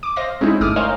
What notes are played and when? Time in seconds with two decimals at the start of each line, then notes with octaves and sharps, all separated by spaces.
0.03 D6
0.16 C5 D#5 F5 A#6
0.41 G#3 C4 C#4 D#4 E4
0.61 G1 A3 D6 D#6 F6
0.76 A#4 C5 C#5 D#5 F5 G#5